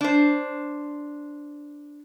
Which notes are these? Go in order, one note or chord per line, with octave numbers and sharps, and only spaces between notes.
D4 C5